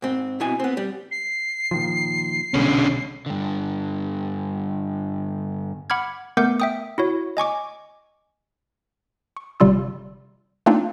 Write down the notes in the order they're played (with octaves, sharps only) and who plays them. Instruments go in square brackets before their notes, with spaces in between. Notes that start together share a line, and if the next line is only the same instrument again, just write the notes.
[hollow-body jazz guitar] G#2 C4
B2 C4 E4 D#5 G#5
B3 C4
G3
[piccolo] C7
[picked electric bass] A#2 D#3 F3
[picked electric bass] B1 B2 G#3 [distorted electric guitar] D3 C#4
[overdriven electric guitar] G2 D3
[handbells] F#5 B5 D6 F6 G#6
A3 B3 A#4 F#5 D6 G6
E5 G5 D#6
E4 F#4 C#5
D#5 G#5 C#6 D6
[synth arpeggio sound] C#6
G1 C3 G3 F4 E6
A3 A#3 C4 D4 D#4 F4